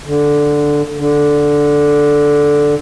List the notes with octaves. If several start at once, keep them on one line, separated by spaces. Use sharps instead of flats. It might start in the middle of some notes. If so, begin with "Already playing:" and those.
D3
D3